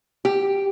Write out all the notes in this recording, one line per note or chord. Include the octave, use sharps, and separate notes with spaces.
G4